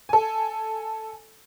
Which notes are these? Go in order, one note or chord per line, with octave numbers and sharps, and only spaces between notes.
A4 G#5